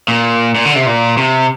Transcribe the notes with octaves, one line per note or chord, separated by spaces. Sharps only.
A#2
A#2
D3
C3
A#2
C3